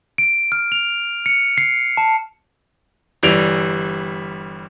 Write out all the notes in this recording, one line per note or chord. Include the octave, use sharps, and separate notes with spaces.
D7
F6
F7
C#7
C7
A5
G1 E3 G3 D7 F7